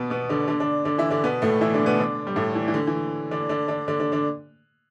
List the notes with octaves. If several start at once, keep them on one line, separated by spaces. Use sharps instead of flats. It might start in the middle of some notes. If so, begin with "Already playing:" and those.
Already playing: B2 B3
B2 B3
D3 D4
D3 D4
D3 D4
D3 D4
E3 E4
D3 D4
B2 B3
A2 A3
E3 E4
D3 D4
B2 B3
D3 D4
G3
A2 A3
E3
E3
D3
E3
D3 D4
D3 D4
D3 D4
D3 D4
D3 D4
D3 D4